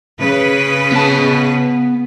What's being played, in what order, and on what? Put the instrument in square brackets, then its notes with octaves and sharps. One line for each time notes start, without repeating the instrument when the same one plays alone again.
[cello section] C#3 B4
[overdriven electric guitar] B3 A5